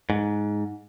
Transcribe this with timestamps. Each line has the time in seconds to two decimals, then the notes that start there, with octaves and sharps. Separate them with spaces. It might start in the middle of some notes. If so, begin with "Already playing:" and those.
0.10 G#2